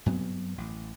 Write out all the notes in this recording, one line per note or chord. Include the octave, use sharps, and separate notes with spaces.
G2 F#3 B3 C4
A1